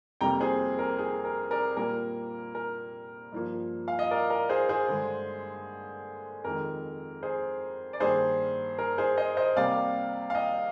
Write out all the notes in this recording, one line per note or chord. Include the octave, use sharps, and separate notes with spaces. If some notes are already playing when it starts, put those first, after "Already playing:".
F2 C3 G3 A#3 G5 A#5
G#4 C5
A#4
G#4
A#4
A#4 D5
A#2 G3 A#3 A#4
A#4
G2 F3 A#3
F5
D#5
A#4 D5
A#4
G#4 C5
G#4 C5
G2 D3 G#3
F2 D#3 G#3 A#4
G#4 C5
D5
G2 D#3 A#3 G#4 C5
A#4
G#4 C5
C5 D#5
C5 D#5
C3 G3 A#3 D5 F5
F5
D#5 G5